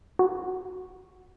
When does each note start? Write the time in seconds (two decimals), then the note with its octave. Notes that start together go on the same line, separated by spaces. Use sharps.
0.19 F#4